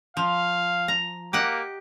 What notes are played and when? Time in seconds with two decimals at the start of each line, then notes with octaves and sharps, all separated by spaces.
0.17 F3 F5
0.88 A#5
1.33 A#3 G4 D#5 F#5